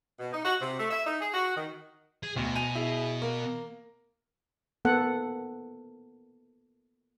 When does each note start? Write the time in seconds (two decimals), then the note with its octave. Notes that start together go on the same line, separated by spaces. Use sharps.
0.20 B2
0.33 D#4
0.45 F#4
0.61 C3
0.79 A3
0.91 E5
1.07 D#4
1.21 G#4
1.34 F#4
1.56 D#3
2.23 G#4
2.36 D2 B2
2.55 G#5 D#7 F7
2.75 E4 G#4
3.22 A#3
4.85 A#3 B3 A4 F#5